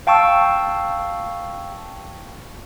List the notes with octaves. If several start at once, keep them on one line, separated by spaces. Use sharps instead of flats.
F5 G5 A5 C#6 E6